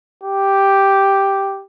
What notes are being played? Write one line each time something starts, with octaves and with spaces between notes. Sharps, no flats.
G4